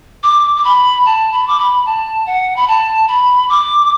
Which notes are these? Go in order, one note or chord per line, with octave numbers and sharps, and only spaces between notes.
D6
D6
B5
A5
B5
D6
B5
A5
F#5
B5
A5
B5
D6